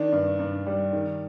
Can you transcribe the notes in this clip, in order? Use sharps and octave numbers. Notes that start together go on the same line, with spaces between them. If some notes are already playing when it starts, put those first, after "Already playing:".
Already playing: D#3 D4
G2
G2
G3
D#3